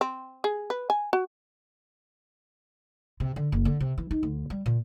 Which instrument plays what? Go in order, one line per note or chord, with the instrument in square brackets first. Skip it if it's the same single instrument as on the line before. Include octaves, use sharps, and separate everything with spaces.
[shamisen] C4
G#4
B4
G#5
F#4
[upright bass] C3
D3
F#1
D3
C3
E3
D#4
D2
G3
A#2